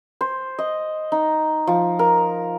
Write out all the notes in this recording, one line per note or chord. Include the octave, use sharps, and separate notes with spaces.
C5
D#5
D#4
F3
A#4